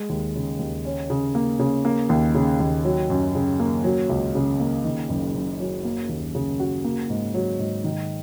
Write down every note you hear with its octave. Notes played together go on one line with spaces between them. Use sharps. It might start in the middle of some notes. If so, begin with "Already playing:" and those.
Already playing: G#3
D#2
C#3
D#2
C#4
C#3
A#3
C#3
A#3
D#2
C#3
D#2
F#3
F#2
C#3
A#3
F#3
C#2
C#3
A#3
D#3
F#1
F#2
F#3
A#3
D#2
C#3
F#4
A#3
G#2
F#3
G#2
D#3